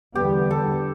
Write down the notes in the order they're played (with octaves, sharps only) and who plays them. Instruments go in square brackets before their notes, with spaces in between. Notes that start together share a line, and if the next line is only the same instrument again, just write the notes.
[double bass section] E2 D3 G3 B3 [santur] G4
[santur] A4